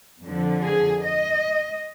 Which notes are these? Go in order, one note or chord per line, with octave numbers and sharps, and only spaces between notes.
F2 D3 F3
G#4
D#5